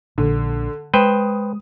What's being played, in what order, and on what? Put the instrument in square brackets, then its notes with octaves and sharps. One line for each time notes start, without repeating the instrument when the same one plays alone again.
[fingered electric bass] A#1 [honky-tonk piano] D3
[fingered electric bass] G#3 [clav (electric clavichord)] B4 C5 G5 [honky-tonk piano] D#6